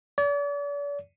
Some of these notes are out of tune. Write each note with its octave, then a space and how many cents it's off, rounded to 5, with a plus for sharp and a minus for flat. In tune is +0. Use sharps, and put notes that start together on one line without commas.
D5 -40